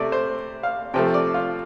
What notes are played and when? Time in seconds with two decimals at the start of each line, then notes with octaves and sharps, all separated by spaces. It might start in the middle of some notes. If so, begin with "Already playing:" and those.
Already playing: C3 A3 D5
0.12 C5
0.63 F5
0.94 C3 F3 A3 G5
1.14 D5
1.34 F4